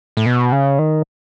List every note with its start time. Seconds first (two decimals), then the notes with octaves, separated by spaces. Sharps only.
0.17 A2
0.26 B2
0.52 C#3
0.79 D#3